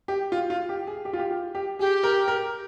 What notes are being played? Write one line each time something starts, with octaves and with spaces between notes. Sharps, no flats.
G4
F4
F4
G4
G#4
G4
F4
G4
F4
G4
G4 G#4
A#4
A#4